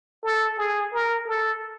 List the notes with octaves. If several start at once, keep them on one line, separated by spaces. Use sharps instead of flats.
A4
G#4
A#4
A4